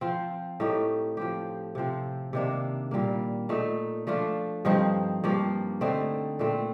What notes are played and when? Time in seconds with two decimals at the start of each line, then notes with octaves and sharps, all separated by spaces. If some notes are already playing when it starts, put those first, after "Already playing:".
0.01 F3 C4 F4
0.60 A2 A3 D#4 G4
1.17 F3 C4 G4
1.75 C3 F3 C4
2.33 C3 D#3 A#3 D4
2.91 A#2 G3 A#3
3.49 A#2 A3 D#4
4.07 F3 A3 D4 F4
4.65 G2 F3 C4 D#4
5.24 G2 F3 A#3
5.81 D3 A3 C4 D#4
6.39 A#2 A3 C4